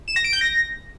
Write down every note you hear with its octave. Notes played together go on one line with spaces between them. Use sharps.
E7
A#6
D7
G6
A#6